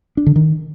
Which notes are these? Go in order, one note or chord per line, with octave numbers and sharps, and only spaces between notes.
D4
D3
D#3